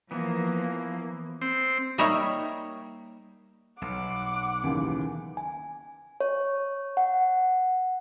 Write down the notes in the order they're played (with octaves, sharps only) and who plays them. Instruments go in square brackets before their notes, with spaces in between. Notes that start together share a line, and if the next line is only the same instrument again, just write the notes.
[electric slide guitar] E3 B3 [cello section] F3 A#3
[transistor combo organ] C4
[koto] G3 A#3 D#4 C#5 E5
[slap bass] B1 [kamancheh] F#5 D6
[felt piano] D#2 C#3 E3
[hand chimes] G#5
C#5
F#5